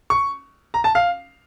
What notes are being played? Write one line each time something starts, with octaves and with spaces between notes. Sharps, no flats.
C#6
A#5
A5
F5